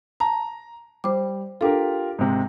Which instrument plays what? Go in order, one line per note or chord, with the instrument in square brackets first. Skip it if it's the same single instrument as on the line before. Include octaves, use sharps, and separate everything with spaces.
[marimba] A5 [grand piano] A#5
[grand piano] G3 [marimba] C5 D6
[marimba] D4 A4 [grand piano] F4 G4 A#4
[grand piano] G#2 C3